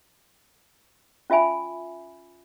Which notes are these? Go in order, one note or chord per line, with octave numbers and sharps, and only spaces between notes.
C#4 F4 E5 G#5 B5